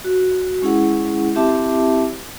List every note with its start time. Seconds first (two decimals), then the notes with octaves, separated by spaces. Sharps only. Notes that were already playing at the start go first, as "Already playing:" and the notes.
0.04 F#4
0.62 G#3 C#4 E4 G#4 F#5
1.35 C4 E4 G4 E5 A5 D6